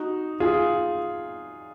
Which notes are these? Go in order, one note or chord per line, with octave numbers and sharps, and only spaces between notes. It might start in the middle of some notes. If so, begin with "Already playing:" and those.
Already playing: D#4 F#4
F4 G#4